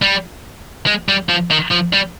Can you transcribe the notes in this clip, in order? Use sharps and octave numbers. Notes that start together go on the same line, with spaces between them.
G3
G#3
G3
F3
D#3
F3
G3